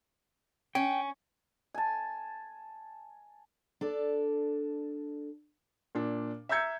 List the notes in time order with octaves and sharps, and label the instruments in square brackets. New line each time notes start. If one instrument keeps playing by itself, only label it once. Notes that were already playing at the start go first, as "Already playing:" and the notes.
[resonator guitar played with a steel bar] C#4 [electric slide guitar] G5
[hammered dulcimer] G#5 A5
[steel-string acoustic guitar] D4 A4 D5
[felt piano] A#2 D4
E5 A#5 E6 G6 G#6 C#7